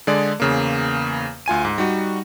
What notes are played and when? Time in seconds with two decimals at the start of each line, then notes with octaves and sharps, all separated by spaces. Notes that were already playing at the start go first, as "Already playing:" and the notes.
0.07 D3 G#3 G#4 D5
0.40 E2 C#3 A#3
1.46 D2 F4 G#5 D#7
1.65 G#2
1.78 G3 D#4 F#4